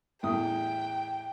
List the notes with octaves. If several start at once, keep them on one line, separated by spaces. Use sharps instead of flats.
A1 E2 G5 D#6